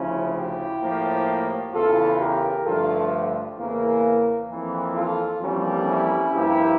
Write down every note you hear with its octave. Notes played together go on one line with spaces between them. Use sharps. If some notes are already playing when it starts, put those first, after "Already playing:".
Already playing: D2 C#3 F3 C#4 E4
E4 G4
A2 F3 A#3
E2 C#3 E3 F4 A4
G4 A#4
G2 D3 F3 A3 F4 A4
E2 C#3 E3 A#3
F2 E3 A#3
F4 A4
F2 E3 G3 A#3 C#4
C#4 E4
G2 F3 A#3 E4 G4